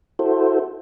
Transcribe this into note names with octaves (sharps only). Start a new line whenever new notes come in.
E4 F#4 A4 C5